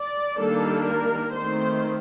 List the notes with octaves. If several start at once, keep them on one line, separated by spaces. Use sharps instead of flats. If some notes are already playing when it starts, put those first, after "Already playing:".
Already playing: D5
D#3 G3 A#3 D4 A4
A#4
D#3 A3 C4 C5